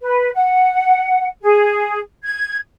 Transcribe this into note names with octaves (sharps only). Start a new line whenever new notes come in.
B4
F#5
G#4
G#6